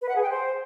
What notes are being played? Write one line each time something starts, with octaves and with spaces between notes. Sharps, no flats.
B4
F#5
G#4
G5
C5